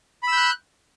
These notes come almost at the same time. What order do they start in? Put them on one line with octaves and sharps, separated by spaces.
B5 E6 G6 F#6